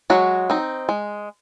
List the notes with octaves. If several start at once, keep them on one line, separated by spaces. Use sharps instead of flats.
F#3 G#3 F#4
C4 D#4
G#3